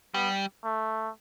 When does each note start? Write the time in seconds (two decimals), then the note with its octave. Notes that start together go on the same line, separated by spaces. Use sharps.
0.14 G3 B3
0.64 A3